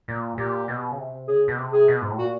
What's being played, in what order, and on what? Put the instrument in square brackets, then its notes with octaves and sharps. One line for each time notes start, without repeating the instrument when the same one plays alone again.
[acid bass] A#2
[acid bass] A#2 [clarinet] G4
[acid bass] B2
C#3
C3
[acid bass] C#3 [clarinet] G#4
[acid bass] B2
C3
[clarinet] G#4
[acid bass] B2
G#2
A2
[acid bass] A#2 [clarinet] F#4